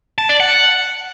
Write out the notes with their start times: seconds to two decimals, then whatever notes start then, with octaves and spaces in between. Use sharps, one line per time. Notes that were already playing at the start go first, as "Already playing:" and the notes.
0.18 A5
0.29 D5
0.40 F#5